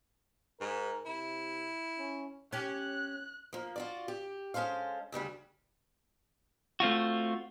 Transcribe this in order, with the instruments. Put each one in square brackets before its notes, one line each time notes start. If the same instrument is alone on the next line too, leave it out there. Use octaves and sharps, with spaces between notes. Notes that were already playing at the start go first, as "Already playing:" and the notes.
[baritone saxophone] G#2 [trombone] A#4
[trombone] C3 [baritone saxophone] E4
[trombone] C#4
[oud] C#4 G4 [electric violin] F#6
[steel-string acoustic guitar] F3 A#3
F4 F#4 D5
G4
G#3 C#4 A4 C5 F5
D2 C#3 G3 F#4
[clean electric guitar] A3 C4 F4 F#4